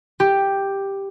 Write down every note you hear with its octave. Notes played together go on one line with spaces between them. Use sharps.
G4